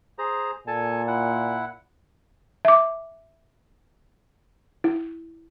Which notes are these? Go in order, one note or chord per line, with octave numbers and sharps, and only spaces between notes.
G#4 C5 A#5
A#2 A4 G#5 A5
E4 F#5
E5 D6
E4